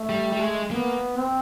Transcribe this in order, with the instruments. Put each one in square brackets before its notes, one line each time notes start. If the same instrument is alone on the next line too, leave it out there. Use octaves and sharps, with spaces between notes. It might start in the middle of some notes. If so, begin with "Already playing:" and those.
Already playing: [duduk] A3
[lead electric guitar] G3
G3
G#3
[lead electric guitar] A#3 [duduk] B3
[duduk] C4